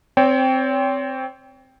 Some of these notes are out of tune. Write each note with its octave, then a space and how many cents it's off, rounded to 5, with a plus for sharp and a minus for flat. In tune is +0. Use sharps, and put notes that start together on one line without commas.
C4 +0 C#5 +35 G5 +5